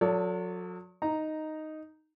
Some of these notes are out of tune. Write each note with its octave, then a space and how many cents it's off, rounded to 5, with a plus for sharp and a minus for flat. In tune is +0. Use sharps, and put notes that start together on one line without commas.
F#3 -40 A4 +20 D5 -45
D#4 +0 A#5 +0